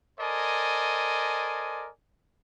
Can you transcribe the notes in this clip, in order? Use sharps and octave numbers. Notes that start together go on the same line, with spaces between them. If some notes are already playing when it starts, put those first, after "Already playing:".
A4 A#4 C5 D5 D#5 G#5